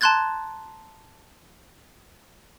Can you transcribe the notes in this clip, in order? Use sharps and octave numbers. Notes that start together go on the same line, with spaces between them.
A5 A#5 C6 F#6 G#6 A6